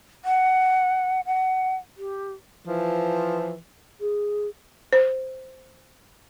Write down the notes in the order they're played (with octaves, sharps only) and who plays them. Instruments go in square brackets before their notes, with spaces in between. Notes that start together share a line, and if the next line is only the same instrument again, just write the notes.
[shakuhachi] F#5
F#5
G4
[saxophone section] E3 F3
[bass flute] G#4
[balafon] C5